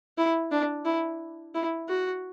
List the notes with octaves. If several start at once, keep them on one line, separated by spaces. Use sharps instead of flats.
E4
D4
E4
E4
F#4